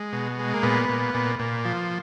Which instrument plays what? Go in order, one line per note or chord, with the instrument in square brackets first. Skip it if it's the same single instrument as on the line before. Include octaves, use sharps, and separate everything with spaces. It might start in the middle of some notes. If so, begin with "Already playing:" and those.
Already playing: [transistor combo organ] G#3
B2
G#3
A#3
A#2 B3
A#2
A#2
A#2
F3